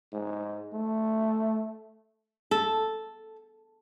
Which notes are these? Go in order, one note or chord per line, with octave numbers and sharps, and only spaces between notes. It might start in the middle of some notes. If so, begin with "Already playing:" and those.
G#2
A3
A4